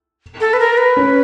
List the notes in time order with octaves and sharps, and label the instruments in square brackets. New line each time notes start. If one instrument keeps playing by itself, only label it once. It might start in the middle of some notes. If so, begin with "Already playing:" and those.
[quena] A4
B4
A#4
B4
[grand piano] C#4